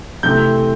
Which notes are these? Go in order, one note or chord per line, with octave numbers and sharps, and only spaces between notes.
C3 E3 A3 C4 G6